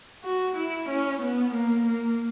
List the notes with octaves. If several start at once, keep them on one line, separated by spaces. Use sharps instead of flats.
F#4
E4
C#4
B3
A#3
A#3